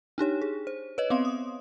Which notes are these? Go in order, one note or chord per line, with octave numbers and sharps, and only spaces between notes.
D4 D#4 G4 C#5
G#4
C5
B4 C#5 D#5
B3 C4 F5 C6
D#6